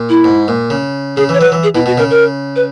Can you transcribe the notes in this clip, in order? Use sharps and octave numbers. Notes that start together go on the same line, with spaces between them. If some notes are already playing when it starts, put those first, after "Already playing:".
Already playing: A#2
E4
G#2
A#2
C#3
C#3 G#4
E3 C#5
F#3 B4
E3
G#4
B2 E4
B2 F#4
C#3 A#4
A#4
B4